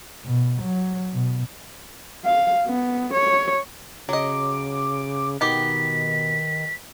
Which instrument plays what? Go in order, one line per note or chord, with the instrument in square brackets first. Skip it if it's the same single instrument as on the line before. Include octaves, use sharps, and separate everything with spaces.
[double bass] B2
F#3
B2
[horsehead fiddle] F5
B3
C#5
[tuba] C#3 [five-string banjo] F#3 D#5 [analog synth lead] D6
[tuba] B2 [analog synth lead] D#3 [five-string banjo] B3 G4 [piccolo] B6